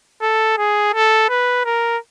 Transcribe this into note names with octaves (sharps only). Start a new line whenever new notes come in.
A4
G#4
A4
B4
A#4